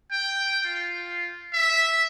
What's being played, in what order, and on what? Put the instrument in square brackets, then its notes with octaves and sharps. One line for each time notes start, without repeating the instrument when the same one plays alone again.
[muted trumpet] G5
F4
E5